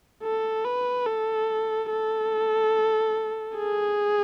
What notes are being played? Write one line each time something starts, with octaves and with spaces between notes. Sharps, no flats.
A4
B4
A4
A4
G#4